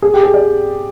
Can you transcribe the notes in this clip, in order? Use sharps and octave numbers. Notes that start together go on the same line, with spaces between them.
G#4
G4
G#4
D5